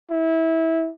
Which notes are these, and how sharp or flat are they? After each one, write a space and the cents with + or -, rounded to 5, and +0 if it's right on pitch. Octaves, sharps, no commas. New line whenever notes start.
E4 -20